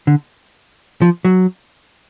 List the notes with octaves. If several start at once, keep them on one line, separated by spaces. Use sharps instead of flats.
D3
F3
F#3